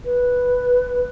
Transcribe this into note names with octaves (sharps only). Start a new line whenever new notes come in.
B4